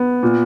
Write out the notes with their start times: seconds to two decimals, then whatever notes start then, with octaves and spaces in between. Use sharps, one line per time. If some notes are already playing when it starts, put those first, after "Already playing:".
Already playing: B3
0.23 A#2